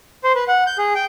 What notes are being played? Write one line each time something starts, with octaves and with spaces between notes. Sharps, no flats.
C5
B4
F#5
G6
G#4
G5